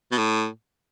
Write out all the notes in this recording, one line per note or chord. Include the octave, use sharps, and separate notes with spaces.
B2
A2